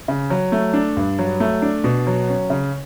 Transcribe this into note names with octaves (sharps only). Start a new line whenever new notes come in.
C#3
F#3
A3
D4
G2
F#3
A3
D4
B2
F#3
C#4
C#3